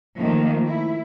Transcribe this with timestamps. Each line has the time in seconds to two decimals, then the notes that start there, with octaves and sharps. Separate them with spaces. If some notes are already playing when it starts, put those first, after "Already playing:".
0.17 D#3 F3 A3 A#3
0.68 E4